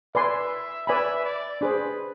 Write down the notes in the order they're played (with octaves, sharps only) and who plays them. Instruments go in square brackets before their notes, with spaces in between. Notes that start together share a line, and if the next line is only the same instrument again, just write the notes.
[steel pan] B4 D5 G#5 C6 [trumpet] E5
[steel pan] B4 D5 G#5 B5 [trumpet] E5
[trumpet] D5
[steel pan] D4 G#4 C5 [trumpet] B4